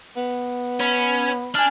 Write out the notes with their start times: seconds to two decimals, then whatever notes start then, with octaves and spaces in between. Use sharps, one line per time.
0.16 B3
0.80 C#4 B5
1.55 D4 G#5 F6